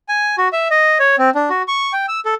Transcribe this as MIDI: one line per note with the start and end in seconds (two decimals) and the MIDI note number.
0.09 0.36 80
0.38 0.48 66
0.53 0.68 76
0.71 0.98 75
1.00 1.16 73
1.18 1.30 60
1.35 1.49 62
1.50 1.62 66
1.68 1.93 85
1.93 2.06 79
2.08 2.20 88
2.25 2.35 69